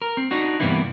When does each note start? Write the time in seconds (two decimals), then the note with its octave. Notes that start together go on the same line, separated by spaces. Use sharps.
0.02 A#4
0.17 C4
0.31 D4 D#4 F#4
0.60 G2 C3 E3 A#3 B3 E4